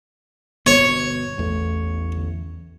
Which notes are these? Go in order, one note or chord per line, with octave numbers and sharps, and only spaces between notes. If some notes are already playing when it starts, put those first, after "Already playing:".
G1 B2 C#5
A1 E2 A3